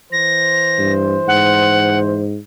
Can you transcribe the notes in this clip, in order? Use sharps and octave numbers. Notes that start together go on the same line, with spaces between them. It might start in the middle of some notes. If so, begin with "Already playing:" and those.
E3 C5 A#6
G2
G#2 F#5